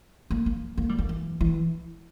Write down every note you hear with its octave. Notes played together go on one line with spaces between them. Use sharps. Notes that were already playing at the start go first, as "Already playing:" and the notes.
A#3
A#3
A#3
G3
A#3
E3
E3